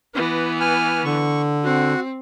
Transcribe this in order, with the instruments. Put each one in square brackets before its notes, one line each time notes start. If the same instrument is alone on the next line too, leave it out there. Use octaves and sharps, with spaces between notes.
[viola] E3 B3
[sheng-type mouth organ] G#5 F6
[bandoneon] D3 [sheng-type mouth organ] C#6
[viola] C4 [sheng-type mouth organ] F#4